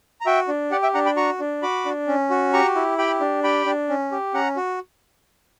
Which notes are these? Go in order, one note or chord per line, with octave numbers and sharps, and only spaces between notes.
A#5
F#4 E5 G5
D4
G4 D5 F#5
E5 G5
D4 F#5 A#5
G5 B5
F#4 A#5 C#6
D4
F#4 B5 D6
D4
C#4
F#4
G4 A#5 C#6
E4
G4 G5 B5
D4
G4 G5 B5
D4
C#4
G4
C#4 F#5 A#5
F#4